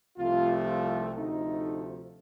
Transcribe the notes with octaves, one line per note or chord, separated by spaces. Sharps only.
C2 C3 F3 A3 F4
F4
D2 C3 F3 A3 D#4